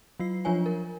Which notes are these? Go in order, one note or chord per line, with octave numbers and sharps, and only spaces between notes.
F#3 F4 C7
F3 D4 F4 C#5 G#5
A#4